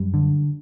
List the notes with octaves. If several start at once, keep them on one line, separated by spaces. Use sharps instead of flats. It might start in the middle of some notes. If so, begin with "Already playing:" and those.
Already playing: F#2 G3
D3